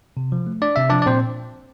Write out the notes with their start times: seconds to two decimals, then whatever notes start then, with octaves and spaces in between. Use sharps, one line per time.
0.17 C3
0.32 F3
0.47 A3
0.62 D4 D5
0.76 C3 E5
0.89 F3 D4 D5
1.02 D5
1.06 A#2 C4 C5